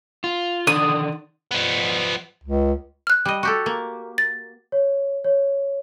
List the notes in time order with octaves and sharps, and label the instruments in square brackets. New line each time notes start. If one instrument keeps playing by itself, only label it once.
[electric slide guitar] F4
[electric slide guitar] D3 D#3 D4 [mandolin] D#6
[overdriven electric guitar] F3 B3
[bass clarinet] C#2
[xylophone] F6 F#6
[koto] G3 D#5
F#4 G4 A4
A#3
[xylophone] A6
[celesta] C#5
C#5